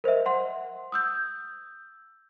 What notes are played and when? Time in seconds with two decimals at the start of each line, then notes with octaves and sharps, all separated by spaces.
0.04 A#4 C5 D#5 E5
0.26 F#5 C6
0.92 D#6 E6 G6